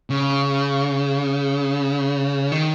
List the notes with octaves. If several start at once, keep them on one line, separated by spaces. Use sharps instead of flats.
C#3
D#3